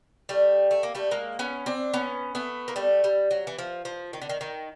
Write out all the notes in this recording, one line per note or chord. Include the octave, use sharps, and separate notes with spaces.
G3 A3
A3
A#3
G3 A3
G#3 A#3
B3 C#4
C4 D4
B3 C#4
A3 B3
A#3
G3 A3
G3
F#3
E3
F3
F3
D#3
D3
D#3
D#3